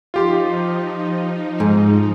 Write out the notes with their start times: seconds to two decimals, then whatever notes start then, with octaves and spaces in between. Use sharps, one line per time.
0.14 F3 D#4 F4 G4 C6
1.60 G#2